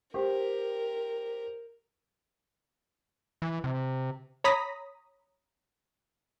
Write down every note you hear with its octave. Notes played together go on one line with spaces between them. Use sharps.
G4 A#4 C5
E3
C3
C#5 A#5 B5 D#6 A#6 B6